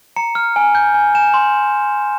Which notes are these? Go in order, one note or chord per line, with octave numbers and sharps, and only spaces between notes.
A#5 C#7
F6
G#5
G6
G#5
G#5 E7
C6